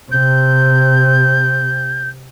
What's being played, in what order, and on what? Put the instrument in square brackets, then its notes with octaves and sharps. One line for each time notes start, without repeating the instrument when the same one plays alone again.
[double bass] C3 [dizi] G6